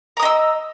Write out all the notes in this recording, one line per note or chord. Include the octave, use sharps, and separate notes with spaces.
D#5 A#5 D#6 E6